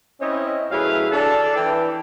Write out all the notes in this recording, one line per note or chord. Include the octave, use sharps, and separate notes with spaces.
C4 C#4 E4 C#5 D#5
A2 F#3 E4 G#4 B4 F5
D4 A4
E3 G5